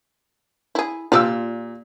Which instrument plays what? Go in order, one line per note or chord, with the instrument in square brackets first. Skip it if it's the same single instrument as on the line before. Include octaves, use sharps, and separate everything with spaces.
[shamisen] E4 G#4
[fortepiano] A#2 E6 [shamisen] F4 G4 D5